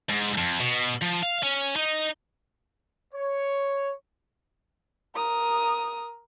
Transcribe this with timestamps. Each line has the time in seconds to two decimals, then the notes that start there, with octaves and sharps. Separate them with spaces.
0.09 G#2
0.38 F2
0.60 B2
1.02 F3
1.23 F5
1.43 C#4
1.76 D#4
3.14 C#5
5.15 A#4 D#6